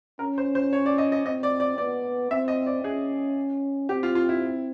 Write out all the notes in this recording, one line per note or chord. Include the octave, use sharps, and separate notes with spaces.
C#4 A#4
C5
C5
C#5
D5
D#5
D#5
C4 D#5
D5
D5
B3 D5
C4 E5
D#5
D5
C#4 G#4
C4 G4
F4
F4
E4